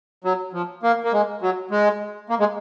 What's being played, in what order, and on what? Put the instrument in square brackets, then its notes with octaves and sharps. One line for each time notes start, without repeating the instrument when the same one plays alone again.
[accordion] F#3
F3
A#3
A#3
G#3
F#3
G#3
A#3
G#3